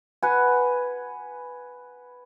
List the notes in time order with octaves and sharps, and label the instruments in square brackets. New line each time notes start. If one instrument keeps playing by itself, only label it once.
[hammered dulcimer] B4 F#5 G#5